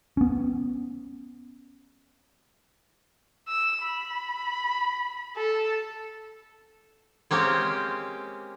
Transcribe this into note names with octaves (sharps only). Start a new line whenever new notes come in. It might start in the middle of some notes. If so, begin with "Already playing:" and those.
B3 C#4
E6
B5
A4
G#3 A#3 C4 C#4 G4